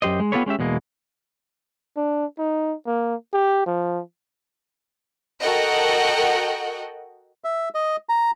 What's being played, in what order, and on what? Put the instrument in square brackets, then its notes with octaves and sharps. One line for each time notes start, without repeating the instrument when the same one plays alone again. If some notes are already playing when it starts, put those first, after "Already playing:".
[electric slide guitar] F#2 G4 C5 D#5
G#3
B3 F4 G4 A4 B4 C#5
G#3 C#4 G4 E5
E2 B2 G#3 A#3
[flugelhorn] D4
D#4
A#3
G4
F3
[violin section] F#4 A4 A#4 D#5 F#5 G5
[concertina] E5
D#5
A#5